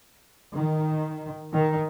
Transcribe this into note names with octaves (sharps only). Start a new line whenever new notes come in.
D#3
D#3